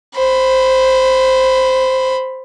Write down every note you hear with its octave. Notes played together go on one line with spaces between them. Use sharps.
C5 B5